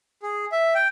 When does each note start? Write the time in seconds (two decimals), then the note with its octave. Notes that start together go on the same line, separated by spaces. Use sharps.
0.23 G#4
0.52 E5
0.75 G5